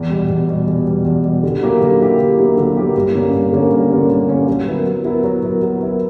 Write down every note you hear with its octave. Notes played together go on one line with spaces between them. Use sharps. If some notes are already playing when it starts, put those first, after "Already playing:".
Already playing: E2
B2 G3
E2
B2 G3
E2
B2 G3
E2
B2 G3
D3
F#3 A#3 E4 G4
D3
F#3 A#3 E4 G4
D3
F#3 A#3 E4 G4
D3
F#3 A#3 E4 G4
G2
D3 A#3 C#4
G2
D3 A#3 C#4
G2
D3 A#3 C#4
G2
D3 A#3 C#4
F#3
B3 E4 A#4
F#3
B3 E4 A#4
F#3
B3 E4 A#4
F#3
B3 E4 A#4